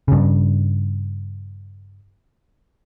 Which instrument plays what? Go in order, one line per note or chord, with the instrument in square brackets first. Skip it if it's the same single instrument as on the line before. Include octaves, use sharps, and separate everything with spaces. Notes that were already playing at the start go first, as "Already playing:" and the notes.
[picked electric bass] G2 C#3